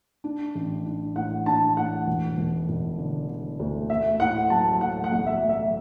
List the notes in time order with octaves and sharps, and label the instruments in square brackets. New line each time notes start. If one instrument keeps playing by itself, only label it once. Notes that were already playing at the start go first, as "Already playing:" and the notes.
[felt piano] D4
A1
D4
[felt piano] A2 [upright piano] F#5
[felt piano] D4 [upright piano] A5
[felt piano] A2 [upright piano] F#5
[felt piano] E1
E1
E1
D3
D3
D2
[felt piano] A3 [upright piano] E5
[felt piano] A2 [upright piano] F#5
[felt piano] F#3 [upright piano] A5
[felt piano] A2 [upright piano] F#5
[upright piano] F#5
[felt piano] B1
[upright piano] E5
[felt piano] A3
[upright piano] E5